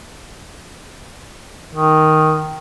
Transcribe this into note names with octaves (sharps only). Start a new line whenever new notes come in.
D#3